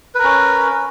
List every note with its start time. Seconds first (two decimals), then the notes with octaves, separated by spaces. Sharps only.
0.15 B4
0.19 A#4
0.24 C#4